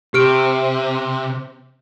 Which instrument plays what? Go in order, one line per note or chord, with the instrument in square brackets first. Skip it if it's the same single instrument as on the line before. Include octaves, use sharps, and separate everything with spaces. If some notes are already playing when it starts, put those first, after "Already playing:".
[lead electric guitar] C3 [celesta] G4 F6 D7